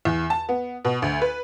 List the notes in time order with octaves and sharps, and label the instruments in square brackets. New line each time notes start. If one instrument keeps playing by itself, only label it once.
[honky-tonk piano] E2
A5
B3
B2
D2
B4